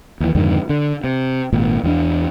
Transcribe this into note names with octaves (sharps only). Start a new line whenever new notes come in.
D#2 E3
F2 G#2 D3 D#3
D3
C3
G#1 A#2
E2 F#3 D4